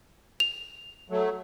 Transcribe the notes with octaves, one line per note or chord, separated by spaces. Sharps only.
F7
F#3 A3